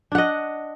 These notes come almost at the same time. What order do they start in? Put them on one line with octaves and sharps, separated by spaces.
D4 F#5 D#5